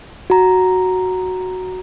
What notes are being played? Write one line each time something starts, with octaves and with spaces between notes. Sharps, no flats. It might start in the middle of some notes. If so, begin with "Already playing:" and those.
F#4 A#5